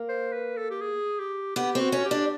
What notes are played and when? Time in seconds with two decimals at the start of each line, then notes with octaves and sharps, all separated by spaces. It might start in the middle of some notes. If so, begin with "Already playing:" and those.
Already playing: A#3
0.09 C5
0.33 B4
0.57 A4
0.71 G4
0.82 G#4
1.20 G4
1.56 B3 G4
1.75 C4
1.80 F#4
1.92 C#4
2.05 G4
2.11 D4